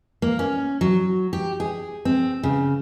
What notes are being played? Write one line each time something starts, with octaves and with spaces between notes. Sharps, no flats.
A#3
C#4
F#3
G4
G#4
C4
C#3